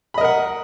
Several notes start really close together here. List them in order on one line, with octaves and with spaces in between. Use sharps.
B5 D#5 A#4 F#5